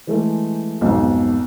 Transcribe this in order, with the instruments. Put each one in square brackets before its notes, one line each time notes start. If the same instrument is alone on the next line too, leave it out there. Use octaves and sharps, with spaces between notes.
[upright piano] E3 G#3 A3
B1 F2 G#2 B2